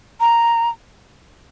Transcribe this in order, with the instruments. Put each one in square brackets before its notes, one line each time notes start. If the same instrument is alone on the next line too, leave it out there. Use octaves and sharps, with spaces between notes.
[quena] A#5